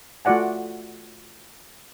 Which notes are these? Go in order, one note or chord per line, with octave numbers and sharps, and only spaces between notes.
A3 F4 F#4 D5 F#5 G#5